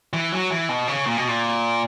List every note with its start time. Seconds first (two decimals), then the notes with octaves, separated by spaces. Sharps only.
0.13 E3
0.32 F#3
0.50 E3
0.69 B2
0.88 C#3
1.06 A#2
1.17 B2
1.28 A#2